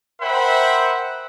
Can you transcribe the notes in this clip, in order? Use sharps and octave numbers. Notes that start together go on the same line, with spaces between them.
A#4 C5 E5 F#5 G5 B5